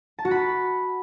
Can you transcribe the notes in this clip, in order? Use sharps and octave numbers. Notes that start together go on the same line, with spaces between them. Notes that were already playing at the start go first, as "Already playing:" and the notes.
A5
F#4
B5